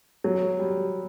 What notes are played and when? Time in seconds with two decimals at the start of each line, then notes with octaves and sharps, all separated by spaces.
0.24 F#3
0.59 G3